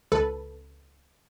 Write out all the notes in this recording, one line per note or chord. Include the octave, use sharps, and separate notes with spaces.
C#2 A4 B4